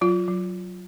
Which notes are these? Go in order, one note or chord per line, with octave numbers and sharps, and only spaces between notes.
F#3 F4
F#3